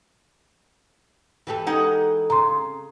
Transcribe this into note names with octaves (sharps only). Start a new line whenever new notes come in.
E3 G4 A4
G#3 D#4 F#5
C#3 A#5 C6